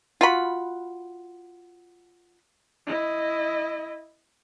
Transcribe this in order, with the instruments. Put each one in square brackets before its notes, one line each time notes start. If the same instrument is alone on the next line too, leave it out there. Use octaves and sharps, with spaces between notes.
[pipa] F4 F#4 B5
[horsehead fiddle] E4 D#5